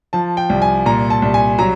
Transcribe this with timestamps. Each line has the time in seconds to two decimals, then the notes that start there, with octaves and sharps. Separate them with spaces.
0.13 F3 A5
0.37 G5
0.50 C2
0.62 G#5
0.86 A#2 A#5
1.10 A5
1.22 C2
1.34 G#5
1.59 F#3 A#5